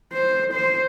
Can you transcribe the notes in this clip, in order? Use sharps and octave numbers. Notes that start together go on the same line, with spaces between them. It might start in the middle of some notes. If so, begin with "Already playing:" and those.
C5
C5